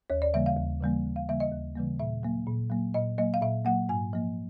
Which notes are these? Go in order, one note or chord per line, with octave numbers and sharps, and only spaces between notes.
D#2 C#5
D5
C#3 E3 G3 A#3 E5
F5
D#2
C#3 E3 G3 A#3
D#2
F5
C#3 E3 G3 A#3 E5
D#5
D#2
C#3 E3 G3 A#3
A#2 E5
F#3 A#3
A#2
F#3 A#3
A#2 D#5
F#3 A#3 D#5
F5
A#2 E5
F#3 A#3 F#5
G#2 G#5
F3 A#3